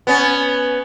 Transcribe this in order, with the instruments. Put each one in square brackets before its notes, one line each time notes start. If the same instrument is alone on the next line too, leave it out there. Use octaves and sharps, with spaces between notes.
[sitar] B3 C#4